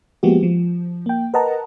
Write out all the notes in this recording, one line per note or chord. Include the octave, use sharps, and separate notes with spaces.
F3 G#3 A#3 B3 F#4 G4
F3
A#3 G5
A#4 B4 D#5 F#5 A5 A#5